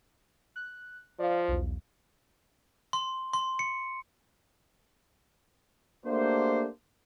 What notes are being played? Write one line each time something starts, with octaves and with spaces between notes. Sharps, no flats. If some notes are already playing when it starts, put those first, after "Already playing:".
F#6
F3 D5 F5
B1 E2
C6
C6
C#7
A3 A#3 D4 F#4 G4 C5